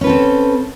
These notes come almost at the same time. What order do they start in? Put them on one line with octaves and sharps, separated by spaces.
C#4 B4 A4 C4